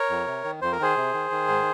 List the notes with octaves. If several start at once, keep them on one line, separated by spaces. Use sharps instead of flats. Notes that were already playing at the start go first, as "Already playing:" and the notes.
Already playing: A#4 C#5
F2
C3
D#3
F2 C5
A#4
D#3 G#4 C5
C3
D#3
D#3
G#2